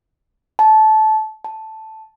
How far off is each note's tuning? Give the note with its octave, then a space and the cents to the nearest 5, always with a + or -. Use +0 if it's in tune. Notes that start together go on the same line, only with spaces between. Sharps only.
A5 -20
A5 +0